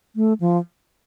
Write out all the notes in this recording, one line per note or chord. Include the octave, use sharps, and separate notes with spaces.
A3
F3